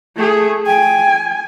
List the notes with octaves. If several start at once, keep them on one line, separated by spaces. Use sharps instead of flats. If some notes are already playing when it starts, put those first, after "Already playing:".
A3 G#4
G5 G#5